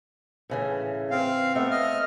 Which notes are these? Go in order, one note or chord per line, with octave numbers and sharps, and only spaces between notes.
A2 C#3 E3
C4 F5
A3 B3 C4 E5
D#5 F6